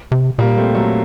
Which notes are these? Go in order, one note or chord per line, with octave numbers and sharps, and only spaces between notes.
C3
A#2 G3 A#3
A3 C4
F#3 A3